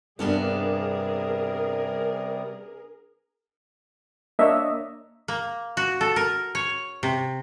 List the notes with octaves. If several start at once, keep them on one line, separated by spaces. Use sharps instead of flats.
G2 C3 G3 B3 C#4 D4 G#4 A#4
A#3 D4 C#5 D#5 E5
A#3
F#4
A4
A#4
C#5
C3